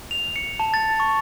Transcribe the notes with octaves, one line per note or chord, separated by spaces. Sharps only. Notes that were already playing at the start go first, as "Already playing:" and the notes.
F7
C#7
A5
A6
C#6